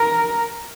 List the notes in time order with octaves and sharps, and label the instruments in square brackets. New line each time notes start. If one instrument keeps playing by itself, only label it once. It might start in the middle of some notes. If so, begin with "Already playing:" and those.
Already playing: [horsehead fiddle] A#4